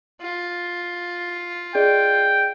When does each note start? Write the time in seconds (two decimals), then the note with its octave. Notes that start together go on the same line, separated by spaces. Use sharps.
0.22 F4
1.75 G#4 D5 D#5 G5